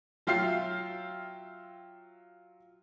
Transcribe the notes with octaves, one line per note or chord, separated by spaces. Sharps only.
F#3 F4 E5 G5 F6 C7